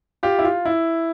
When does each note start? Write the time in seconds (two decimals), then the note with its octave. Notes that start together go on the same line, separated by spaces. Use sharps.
0.23 F4 G4
0.39 E4
0.44 F4
0.65 E4